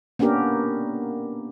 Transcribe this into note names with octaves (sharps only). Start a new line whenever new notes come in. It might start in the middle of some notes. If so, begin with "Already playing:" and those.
A#3 B3 C#4 D4 G4 A#4